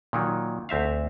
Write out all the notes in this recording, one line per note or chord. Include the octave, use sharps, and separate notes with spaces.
A#2 D#3 F#3
D2 C4 E5 F5